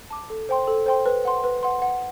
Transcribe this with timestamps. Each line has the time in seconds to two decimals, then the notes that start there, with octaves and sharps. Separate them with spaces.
0.10 A5 D6
0.30 A4
0.49 C5 G5 C6
0.68 A4
0.86 C5 G5 C6
1.06 B4
1.25 F#5 C6
1.44 B4
1.63 F#5 C6
1.82 F#5